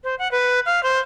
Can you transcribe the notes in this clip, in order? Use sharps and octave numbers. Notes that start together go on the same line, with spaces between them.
C5
F#5
B4
F5
C5